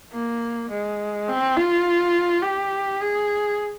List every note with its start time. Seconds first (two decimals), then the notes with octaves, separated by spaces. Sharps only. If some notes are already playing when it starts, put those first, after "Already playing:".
0.12 A#3
0.70 G#3
1.28 C4
1.56 F4
2.43 G4
3.00 G#4